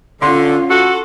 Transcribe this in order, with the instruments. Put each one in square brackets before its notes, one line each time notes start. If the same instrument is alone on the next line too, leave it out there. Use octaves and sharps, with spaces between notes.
[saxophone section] D3 [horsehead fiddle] C#4 F4 [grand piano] C6
[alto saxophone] F#4 [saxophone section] A4